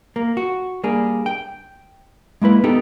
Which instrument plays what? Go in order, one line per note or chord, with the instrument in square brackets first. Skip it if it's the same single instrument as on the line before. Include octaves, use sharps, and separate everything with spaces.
[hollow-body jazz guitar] A#3
F#4
G3 A#3 D4 G#4
G5
G#3 A#3 E4 B4
B3 D#4 G4 A4 B4